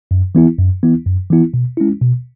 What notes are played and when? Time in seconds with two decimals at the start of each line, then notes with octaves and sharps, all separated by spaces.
0.11 F#2
0.35 E3 B3 E4
0.59 F#2
0.83 E3 B3 E4
1.06 F#2
1.30 E3 B3 E4
1.54 B2
1.77 G#3 C#4 E4
2.01 B2